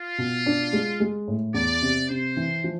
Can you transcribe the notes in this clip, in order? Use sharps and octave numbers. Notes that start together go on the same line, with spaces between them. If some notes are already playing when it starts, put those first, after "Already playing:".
Already playing: F4
B2
D4
G#3
G#3
A2
E2 D5
C3
C3 C5
E3
F3